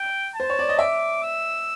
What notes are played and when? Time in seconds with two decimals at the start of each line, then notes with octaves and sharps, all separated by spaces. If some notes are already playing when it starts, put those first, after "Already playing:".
Already playing: G5
0.35 C5 A5
0.50 C#5
0.59 D5
0.69 D#5
0.79 E5 D6
1.23 E6